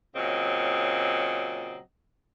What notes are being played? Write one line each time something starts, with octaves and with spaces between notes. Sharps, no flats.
A#2 C#3 F#3 C4 D#5